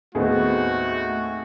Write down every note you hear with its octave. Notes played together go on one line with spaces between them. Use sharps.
D#2 A2 A3 B3 C4 D#4 F#4 G#4